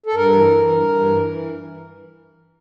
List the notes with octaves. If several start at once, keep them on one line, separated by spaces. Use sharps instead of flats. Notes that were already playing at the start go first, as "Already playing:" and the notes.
A4
G2 A#4
E3
E3
G2
G2
E3
E3